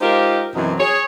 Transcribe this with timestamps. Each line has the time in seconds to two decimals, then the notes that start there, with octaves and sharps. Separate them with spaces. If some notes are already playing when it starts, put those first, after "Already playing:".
0.01 G#3 D#4 F4 G4 A#4 C5
0.54 F#2 B2 E3 F#3 C4 D#4
0.79 G#4 C#5